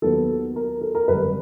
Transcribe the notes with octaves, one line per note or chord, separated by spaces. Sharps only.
D#2 D#3 F#3 B3 A4
A#4
A4
A#4
G#1 F#2 D3 G3 B4